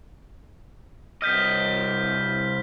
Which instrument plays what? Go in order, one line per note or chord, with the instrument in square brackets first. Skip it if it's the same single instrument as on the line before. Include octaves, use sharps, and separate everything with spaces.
[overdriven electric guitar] C2 D#5 [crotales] F6 G6 B6